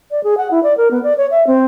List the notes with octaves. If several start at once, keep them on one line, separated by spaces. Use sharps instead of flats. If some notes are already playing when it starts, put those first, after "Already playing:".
D5
G#4
F#5
E4
D5
A#4
B3
D5
C#5
E5
C4